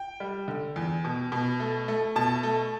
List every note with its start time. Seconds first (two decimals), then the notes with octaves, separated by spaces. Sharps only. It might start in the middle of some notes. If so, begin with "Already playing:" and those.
Already playing: G5
0.20 G3
0.48 D3
0.76 E2
1.05 B2
1.32 B2
1.60 A3
1.88 A3
2.16 B2 A5
2.43 A3